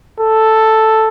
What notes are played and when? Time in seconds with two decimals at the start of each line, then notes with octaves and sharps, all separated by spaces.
0.20 A4